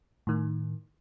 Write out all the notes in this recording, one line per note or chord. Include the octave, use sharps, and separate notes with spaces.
A2 D#3